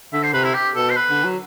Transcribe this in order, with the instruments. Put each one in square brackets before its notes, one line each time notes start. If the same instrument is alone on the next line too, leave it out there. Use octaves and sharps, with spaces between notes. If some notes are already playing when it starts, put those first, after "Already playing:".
[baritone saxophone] D3 [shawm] E5
[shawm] C5
[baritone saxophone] C3 [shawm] B4
[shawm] E4
G4
[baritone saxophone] B2 [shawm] A4
[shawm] C5
B4
[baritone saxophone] D3
F#3